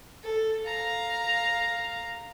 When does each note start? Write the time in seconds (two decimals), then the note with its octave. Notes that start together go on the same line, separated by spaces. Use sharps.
0.23 A4
0.64 F5 A#5